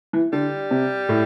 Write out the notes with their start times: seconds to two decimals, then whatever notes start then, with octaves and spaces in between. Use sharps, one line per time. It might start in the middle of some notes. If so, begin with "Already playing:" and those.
0.13 E3
0.33 D3 G3
0.71 C3
1.09 A2